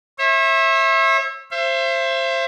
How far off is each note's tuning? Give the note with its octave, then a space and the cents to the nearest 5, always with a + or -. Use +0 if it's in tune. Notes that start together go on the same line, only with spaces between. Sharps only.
C#5 -45 E5 -5
C5 +20 E5 +35